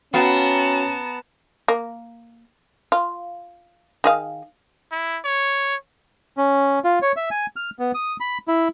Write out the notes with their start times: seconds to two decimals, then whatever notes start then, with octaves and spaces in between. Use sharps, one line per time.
0.14 B3 C#4 F#4 F5 G5 A5 A#5
1.68 A#3
2.92 F4
4.04 D#3 G#4 F5
4.92 E4
5.25 C#5
6.37 C#4
6.84 F4
7.02 C#5
7.16 E5
7.31 G#5
7.56 F6
7.79 B3
7.94 D#6
8.20 B5
8.48 E4